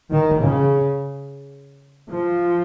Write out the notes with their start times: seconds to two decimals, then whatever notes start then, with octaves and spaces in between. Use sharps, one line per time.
0.11 D#3
0.39 C#3
2.08 F3